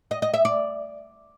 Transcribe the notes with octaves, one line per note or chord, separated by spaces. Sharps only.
D#5
D#5
E5
D5